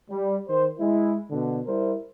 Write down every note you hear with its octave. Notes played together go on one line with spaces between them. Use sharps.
G3
D#3 C5
G#3 E4
B2 D3
G3 E4 A#4 C5